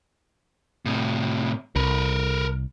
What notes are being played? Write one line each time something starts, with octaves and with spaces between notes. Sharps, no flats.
A2 C3
C2 A#4 B4